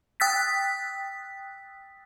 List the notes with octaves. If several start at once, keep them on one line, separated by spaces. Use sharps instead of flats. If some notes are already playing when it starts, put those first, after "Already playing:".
G5 D#6 E6 F#6 A6 B6